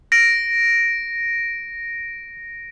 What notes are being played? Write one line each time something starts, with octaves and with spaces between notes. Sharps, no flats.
A#6 D7